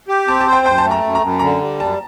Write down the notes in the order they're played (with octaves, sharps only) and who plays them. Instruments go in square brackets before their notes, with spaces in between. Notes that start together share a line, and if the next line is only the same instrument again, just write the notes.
[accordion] G4
[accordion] C4 [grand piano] A5
[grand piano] A5
[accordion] C5
[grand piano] G5
[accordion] F#2 [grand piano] G5
[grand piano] A5
[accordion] A3
[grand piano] A#5
[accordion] F#2
[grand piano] A#5
[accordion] F#2
[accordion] D3 [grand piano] A#5
[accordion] G3
[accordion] F#2 [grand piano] A5